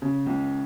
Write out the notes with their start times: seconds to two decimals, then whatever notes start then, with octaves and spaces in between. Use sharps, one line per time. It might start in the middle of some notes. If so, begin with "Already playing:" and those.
0.02 C#3
0.26 C#2